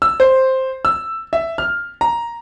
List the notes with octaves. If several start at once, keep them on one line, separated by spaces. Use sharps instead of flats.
E6
C5
E6
E5
F6
A#5